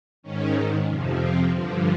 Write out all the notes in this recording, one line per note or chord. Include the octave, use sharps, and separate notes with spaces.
G#2 D#3 C#4
F2 C3 F3
C4
G2 D3 F3